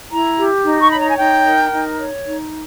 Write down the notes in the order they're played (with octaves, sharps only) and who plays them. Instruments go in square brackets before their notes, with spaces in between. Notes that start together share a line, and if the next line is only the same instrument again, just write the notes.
[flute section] E4 A#5
G4
D#4
C#6
C#5 B5
A#5
G#5
D#4 G5
A#4
D#4
C#5
D#4